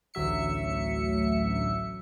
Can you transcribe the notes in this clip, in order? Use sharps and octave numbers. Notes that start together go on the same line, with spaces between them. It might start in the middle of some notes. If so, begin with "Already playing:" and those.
A1 D2 F#3 E5 C#7